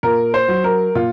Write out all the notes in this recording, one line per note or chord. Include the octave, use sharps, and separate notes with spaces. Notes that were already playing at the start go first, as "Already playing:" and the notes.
A#2 A#4
C5
F#3
A#4
A#2 F4